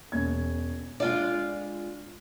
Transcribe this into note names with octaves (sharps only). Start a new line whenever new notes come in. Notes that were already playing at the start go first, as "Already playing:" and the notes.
E1 C#4 G#6
G#3 D4 F4 D5